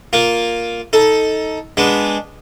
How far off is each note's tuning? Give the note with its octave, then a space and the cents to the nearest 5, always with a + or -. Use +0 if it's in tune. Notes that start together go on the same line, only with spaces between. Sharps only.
A#3 +0 F4 +0
D#4 +15 A4 +0
G#3 -15 B3 -15 D4 -10